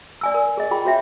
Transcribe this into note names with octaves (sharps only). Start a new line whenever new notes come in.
D5 G#5 E6
A#4
G#4 D#5
F4 G#4 G5 B5
F#4 C#5 E5 G5